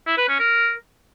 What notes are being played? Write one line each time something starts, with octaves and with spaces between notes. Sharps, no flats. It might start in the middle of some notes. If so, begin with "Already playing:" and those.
E4
B4
C#4
A#4